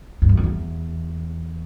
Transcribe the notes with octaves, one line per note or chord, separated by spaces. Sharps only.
G2
F#2
F2
E2